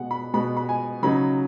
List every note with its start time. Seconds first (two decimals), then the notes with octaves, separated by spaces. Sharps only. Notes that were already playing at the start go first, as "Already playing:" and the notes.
Already playing: B2 G#3 B3 F#5
0.11 B5
0.34 B2 G#3 B3 B5
0.57 B5
0.69 G#5
1.03 C#3 F#3 D#4 B5